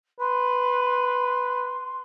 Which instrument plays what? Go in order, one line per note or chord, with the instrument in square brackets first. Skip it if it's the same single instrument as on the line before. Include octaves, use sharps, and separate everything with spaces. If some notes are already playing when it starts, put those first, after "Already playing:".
[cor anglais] B4 [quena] C6